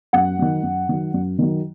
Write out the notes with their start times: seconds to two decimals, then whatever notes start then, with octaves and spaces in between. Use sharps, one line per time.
0.13 F#2 F#5
0.39 D#3 F#3
0.63 F#2
0.89 D#3 F#3
1.14 F#2
1.39 D#3 F#3